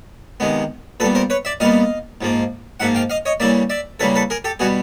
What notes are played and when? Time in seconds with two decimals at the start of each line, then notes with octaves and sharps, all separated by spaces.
0.40 C3 D#3 G#3 B3
1.00 A#2 A4 B4
1.03 G3 B3
1.15 A#4 C5
1.30 B4 C#5
1.45 D5 E5
1.60 A#2 G3 B3 D#5 F5
2.21 G#2 F3 A#3
2.80 G#2 F3 A#3 E5 F#5
2.95 F5 G5
3.10 D#5 F5
3.26 C#5 D#5
3.40 C#3 E3 G3 A#3 D5 E5
3.70 D5 E5
4.00 C#3 E3 G3 A#3 A4 B4
4.15 A4 B4
4.30 G#4 A#4
4.44 G4 A4
4.59 B2 G3 B3 F#4 G#4